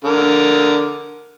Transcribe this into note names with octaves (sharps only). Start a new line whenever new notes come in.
D3 A#4